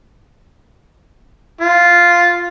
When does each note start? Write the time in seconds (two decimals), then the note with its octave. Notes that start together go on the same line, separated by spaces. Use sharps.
1.60 F4